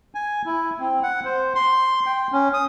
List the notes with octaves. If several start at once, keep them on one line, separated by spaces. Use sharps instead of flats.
G#5
E4
C4
F#5
C5
C6
G5
C#4
D#6